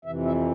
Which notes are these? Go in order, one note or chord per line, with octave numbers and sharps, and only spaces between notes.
F2 C3 E3 E5
E5